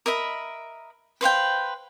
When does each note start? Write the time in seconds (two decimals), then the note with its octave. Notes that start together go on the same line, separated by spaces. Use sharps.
0.06 A#4 D#5 E5 B5
1.21 B4 C5 F5 G5